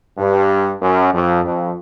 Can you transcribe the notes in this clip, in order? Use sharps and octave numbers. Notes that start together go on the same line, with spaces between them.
G2
F#2
F2
F2